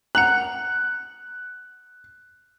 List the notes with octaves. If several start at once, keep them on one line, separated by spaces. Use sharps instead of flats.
F#5 A#5 F#6 F#7